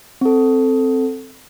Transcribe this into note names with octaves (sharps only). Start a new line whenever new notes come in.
C4 A4